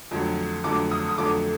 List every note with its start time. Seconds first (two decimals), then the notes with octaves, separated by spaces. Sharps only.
0.11 F2 D3 F#3 A3
0.64 F2 D3 F#3 A3 D6
0.91 D#6
1.09 D#6
1.18 F2 D3 F#3 A3 D6